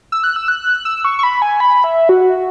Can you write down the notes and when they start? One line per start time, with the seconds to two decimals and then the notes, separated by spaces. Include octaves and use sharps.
0.12 E6
0.24 F#6
0.36 E6
0.48 F#6
0.85 E6
1.05 C#6
1.19 C#6
1.23 B5
1.42 G#5
1.60 B5
1.84 E5
2.09 F#4